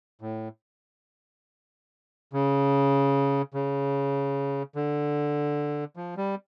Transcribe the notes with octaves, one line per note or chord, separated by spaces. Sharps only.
A2
C#3
C#3
D3
F3
G3